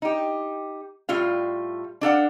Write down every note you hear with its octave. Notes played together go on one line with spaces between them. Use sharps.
D#4 G4
A2 G3 A3 F4 F5
D4 A4 F5 F#5